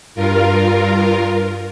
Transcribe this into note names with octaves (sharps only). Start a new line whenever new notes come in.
G2 F4 A#4